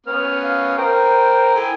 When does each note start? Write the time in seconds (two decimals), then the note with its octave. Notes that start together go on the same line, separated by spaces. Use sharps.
0.06 B3 C#4 F6
0.43 F5
0.78 A#4 C5 G5 A#5
1.55 E4 A4 G5 G#5